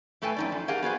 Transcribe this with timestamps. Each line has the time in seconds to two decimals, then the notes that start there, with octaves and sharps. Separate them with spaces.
0.22 A2 A3 A4 B4 G5 G#5
0.36 F#2 D#4 D5
0.52 F3
0.68 G4 G#4 A#4 D5 F5 F#5
0.82 B3 F#4 G#4 C5